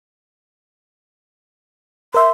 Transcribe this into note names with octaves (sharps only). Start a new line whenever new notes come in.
A#4 E5 C6